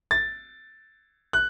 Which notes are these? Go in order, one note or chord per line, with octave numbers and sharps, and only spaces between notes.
A6
F#6